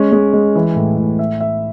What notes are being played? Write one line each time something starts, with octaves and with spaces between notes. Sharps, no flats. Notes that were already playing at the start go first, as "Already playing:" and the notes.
Already playing: G#3 C#4
G#3
G#3
E3
A2
A2
E5
E5